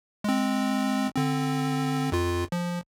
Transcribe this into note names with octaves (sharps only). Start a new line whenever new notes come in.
G#3 C4
D3 C4
F2 F4
F3